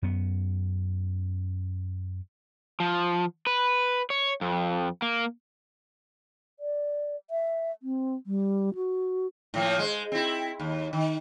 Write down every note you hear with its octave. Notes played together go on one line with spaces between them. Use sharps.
F#2 B3
F3
B4
C#5
F2
A#3
D5
E5
C4
G3
F#4
A2 F3 A#3
G#3 C5
C4 E4
D#2
D#3